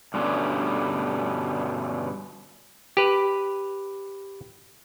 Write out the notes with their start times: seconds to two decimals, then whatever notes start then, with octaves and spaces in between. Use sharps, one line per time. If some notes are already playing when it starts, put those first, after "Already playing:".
0.14 G2 B2 D3 G3 C#4
2.97 G4 B4